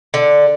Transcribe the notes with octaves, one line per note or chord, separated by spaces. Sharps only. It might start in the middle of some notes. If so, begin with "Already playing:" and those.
D3